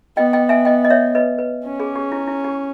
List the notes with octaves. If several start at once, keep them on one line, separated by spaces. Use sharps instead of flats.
B3 D#5 G5
D#5 G5
E5 G#5
D#5 G5
D#5
C#5 E5
B4 D#5
B4
C#4
G#4
G4
E4
E4
G4